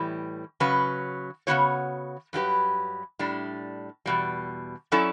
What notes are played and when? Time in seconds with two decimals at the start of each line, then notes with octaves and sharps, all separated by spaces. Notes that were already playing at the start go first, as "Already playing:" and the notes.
Already playing: A2 E3 G3
0.60 C#3 F#3 C#4 F#4 B4
1.47 C#3 E3 B3 F#4 C#5
2.33 G2 F#3 C#4 G4 B4
3.19 A2 G3 D4
4.06 E2 B2 G3
4.92 F#3 C#4 E4 A4 D5